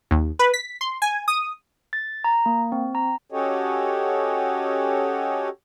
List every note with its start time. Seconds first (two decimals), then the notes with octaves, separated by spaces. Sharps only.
0.11 D#2
0.39 B4
0.54 B6
0.81 C6
1.02 G#5
1.28 D#6
1.93 A6
2.24 A#5
2.46 A#3
2.72 C4
2.95 A#5
3.32 C#4 F#4 G4 A4 C#5 D#5